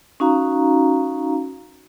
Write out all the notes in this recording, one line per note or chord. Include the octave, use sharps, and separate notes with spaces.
C#4 D#4 F#4 F5 A#5